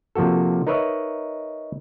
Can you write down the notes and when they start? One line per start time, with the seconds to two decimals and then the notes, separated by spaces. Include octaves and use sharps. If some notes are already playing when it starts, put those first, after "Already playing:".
0.15 C3 F3 A#3 F#4 A4
0.67 D#4 A#4 B4 C#5 D#5 E5